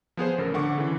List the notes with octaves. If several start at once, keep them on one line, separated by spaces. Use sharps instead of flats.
F3 B3 G#4 C5
A1 C#3 A4 A#4
D3 F#5 C#6 D6
C#3 E3